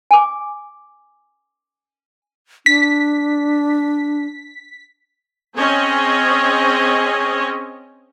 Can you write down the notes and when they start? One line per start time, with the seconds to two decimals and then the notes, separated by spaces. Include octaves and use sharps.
0.11 G#5 D6
2.66 D4 B6
5.57 C4 C#4 G#4 C5 C#5 D#5